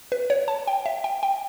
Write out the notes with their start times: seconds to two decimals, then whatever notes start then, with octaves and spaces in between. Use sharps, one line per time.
0.12 B4
0.30 C#5
0.48 A5
0.67 G5
0.86 E5
1.04 G5
1.23 G5